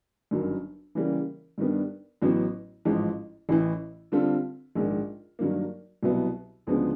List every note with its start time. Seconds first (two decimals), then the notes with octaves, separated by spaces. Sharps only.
0.31 G1 F#2 D#3 F#3
0.95 C#3 E3 G3 A#3 C#4
1.58 G2 D#3 G3 B3 D4
2.22 A1 A2 F#3 B3
2.85 A1 G#2 F3
3.49 A1 A2 E3
4.12 D3 G3 C4 F4 A4
4.75 A#1 G#2 D#3
5.39 G2 D#3 F#3 A#3
6.03 C2 B2 F#3 B3 E4
6.67 D2 C#3 F3 G#3 B3